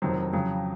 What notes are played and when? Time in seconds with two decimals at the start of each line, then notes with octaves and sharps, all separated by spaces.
0.02 F1 F2 D#3 F#3 C4
0.33 F2 C#3 F#3